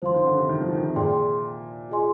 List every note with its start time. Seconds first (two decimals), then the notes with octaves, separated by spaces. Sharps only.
0.02 F3 C5 F5 C6
0.14 D#3
0.26 D3
0.38 C3
0.49 D#3
0.61 F3
0.73 D#3
0.84 C3
0.95 A#2 G#4 D5 G5 C6
1.89 F4 G#4 D#5 G#5 C6